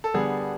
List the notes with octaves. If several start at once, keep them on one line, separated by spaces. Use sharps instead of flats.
A4
D3 G3 B3 G#4